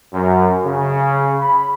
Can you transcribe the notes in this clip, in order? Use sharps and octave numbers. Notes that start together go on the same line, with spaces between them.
F#2
C#3
B5